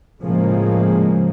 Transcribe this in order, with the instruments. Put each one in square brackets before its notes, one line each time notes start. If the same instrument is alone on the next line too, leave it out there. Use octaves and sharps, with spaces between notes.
[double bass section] A2 C#3 F3 G#3 A#3